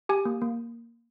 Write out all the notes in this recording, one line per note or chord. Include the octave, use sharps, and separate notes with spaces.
G4 G#5
A#3
A#3